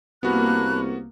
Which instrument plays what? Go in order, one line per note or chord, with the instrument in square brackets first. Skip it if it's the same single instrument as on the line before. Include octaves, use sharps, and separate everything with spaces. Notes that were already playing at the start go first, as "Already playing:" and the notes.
[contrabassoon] C2 [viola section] A#3 [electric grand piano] B3 F#4 [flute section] A5 B5 F#6